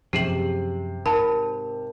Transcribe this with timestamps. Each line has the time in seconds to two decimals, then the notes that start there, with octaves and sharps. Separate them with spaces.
0.13 F#2 C3 F3 G4 G#4 C7 F#7
1.06 G#2 A#4 A5 B5